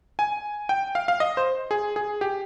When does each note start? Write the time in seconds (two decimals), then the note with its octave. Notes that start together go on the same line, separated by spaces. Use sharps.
0.19 G#5
0.69 G5
0.95 F5
1.08 F5
1.20 D#5
1.37 C5
1.71 G#4
1.96 G#4
2.21 G4